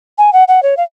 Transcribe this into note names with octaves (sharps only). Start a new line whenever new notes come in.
G#5
F#5
F#5
C#5
F5